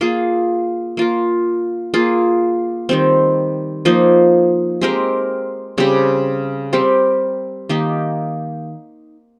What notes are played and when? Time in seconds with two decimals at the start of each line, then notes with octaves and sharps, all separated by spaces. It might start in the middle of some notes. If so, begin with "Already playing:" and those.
0.01 A#3 F4 G#4
0.97 A#3 F4 A#4
1.94 A#3 F4 G#4
2.89 D#3 G3 C4
3.85 F3 A#3 D#4
4.81 G#3 C4 G4 A#4
5.78 C#3 G3 C4 G4
6.73 G3 C4 G4 A#4
7.69 D#3 A#3 D#4 G4